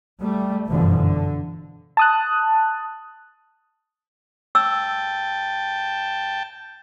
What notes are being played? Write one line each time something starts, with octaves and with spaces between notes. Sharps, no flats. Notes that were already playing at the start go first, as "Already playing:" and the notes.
G3 A3
G1 F#2 B2 D3 E3 F3
D3
A5 D#6 F#6
G5 A5 E6